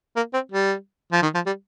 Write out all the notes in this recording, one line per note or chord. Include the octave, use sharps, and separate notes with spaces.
A#3
C4
G3
F3
D#3
F3
G3